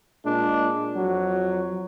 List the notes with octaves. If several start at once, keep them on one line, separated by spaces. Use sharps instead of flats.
A#2 G#3 D4
F2 F#3